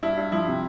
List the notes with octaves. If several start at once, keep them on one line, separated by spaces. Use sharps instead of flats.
G2 E4
G2
F3 E4
C3